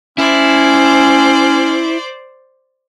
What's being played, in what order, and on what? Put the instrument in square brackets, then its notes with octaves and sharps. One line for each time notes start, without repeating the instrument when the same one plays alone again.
[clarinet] C#4 [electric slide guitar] E4 [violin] C5 D5